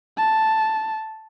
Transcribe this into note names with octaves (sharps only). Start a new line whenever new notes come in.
A5